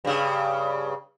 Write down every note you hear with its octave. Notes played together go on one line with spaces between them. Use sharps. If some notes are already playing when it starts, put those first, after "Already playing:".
G2 C#3